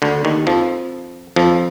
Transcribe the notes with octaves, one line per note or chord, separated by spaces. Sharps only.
D2 D3
D#2 D#3
F2 F3
F2 F3